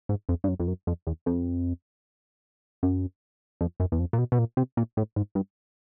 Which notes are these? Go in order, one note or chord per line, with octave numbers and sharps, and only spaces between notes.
G#2
F2
G2
F#2
F2
F#2
F2
E2
F2
F#2
F2
F#2
E2
F2
A#2
B2
B2
A#2
C3
A#2
A2
G#2
G2